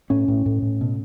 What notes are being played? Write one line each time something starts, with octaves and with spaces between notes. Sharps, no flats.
A2 C#4
A2
A2
A2
B2